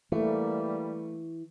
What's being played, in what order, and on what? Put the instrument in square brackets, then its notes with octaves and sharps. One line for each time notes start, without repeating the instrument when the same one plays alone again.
[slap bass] E3 [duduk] G3 [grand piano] A3 [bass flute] A#3